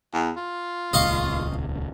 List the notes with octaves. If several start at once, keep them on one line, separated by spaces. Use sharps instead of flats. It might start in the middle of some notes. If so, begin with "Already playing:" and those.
E2
F4
D#1 C#2 D#5 F5 C#6